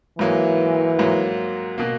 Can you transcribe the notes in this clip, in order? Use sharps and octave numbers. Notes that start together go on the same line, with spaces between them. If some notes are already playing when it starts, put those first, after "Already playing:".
G#2 E3 F#3 A#3
G#2 F#3 A#3
B2 A#3